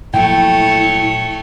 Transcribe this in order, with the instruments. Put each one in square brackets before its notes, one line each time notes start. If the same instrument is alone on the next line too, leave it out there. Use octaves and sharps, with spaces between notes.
[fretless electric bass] A#2 F3 F#3 [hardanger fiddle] A3 C#5 [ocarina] E4 [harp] G5